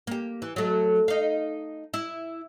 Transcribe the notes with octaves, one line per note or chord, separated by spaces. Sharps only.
A#3 G4
E3
F#3 A3
D#4 F5
E4